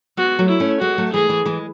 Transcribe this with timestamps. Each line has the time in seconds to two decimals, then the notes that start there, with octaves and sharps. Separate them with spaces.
0.17 G#3 B3 F#4
0.39 F#3 A3
0.49 E4
0.60 A3 C#4
0.81 G#3 B3 F#4
0.98 F#3 A3
1.13 E3 G#3 G#4
1.29 E3 G#3
1.45 E3 G#3